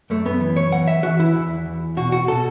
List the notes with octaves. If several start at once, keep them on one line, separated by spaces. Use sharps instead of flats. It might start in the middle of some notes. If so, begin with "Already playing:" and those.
F#2 A3
B3
E3
C#5
E3 F#5
E5
E3 F#4
E4
E2
E2
B2 F#4
F#4
B2 A4